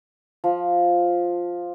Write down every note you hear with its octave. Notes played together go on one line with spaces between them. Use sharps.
F3